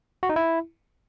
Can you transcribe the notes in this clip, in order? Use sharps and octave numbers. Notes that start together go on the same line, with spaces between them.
F#4
D#4
E4